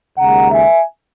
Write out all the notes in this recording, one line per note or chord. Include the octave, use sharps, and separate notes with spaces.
D#2 C#3 G#3 F#5 A#5
E5 G#5